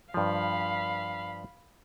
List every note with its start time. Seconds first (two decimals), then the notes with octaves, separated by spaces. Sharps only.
0.14 G2 F3 F5 B5